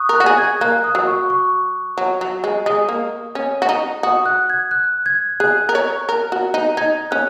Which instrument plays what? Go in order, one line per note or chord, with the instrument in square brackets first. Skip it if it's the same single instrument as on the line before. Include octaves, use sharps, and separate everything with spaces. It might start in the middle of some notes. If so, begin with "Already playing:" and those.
Already playing: [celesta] C#6 D#6 F#6
[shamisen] A#4
[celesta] F#6
[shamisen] F#4
G#4
[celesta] G#6
[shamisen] A#3 [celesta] F#6
[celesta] D#6
[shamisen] F#3
[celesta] C#6
C#6
[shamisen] F#3
F#3
G#3
[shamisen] G#3 [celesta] D#6
[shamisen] A#3
C#4
F#4
D#4
[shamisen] F#4 [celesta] D#6
[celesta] F#6
G#6
F#6
G#6
[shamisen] G#4 [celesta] F#6
[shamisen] A#4
C#5
A#4
F#4
D#4
[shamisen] D#4 [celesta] G#6
[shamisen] C#4 [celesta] F#6